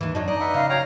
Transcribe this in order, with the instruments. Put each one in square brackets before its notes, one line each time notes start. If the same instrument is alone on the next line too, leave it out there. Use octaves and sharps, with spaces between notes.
[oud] D#2 E3
[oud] F#2 F#3 D#4 [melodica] D4
[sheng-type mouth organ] D#4 D#5 [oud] D5
[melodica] B4 E5 F#5
[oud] C#3 [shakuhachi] F5
[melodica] F#3 G5 [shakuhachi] C#5 [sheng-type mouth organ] F5 A#5